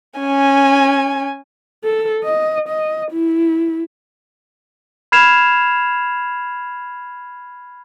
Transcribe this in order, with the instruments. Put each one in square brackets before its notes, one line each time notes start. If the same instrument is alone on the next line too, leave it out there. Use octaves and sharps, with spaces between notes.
[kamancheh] C#4 G#5
[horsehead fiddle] A4
D#5
D#5
E4
[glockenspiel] B5 F6 G#6 C7 E7 F7